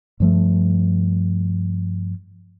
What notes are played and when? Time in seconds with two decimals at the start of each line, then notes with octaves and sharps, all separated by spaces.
0.20 G2 F3 A3